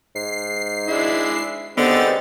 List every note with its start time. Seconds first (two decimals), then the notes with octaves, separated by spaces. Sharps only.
0.15 G#2 C7
0.88 G#3 D4 E4
1.77 D3 G#3 B3 C4 D#4 G4 A6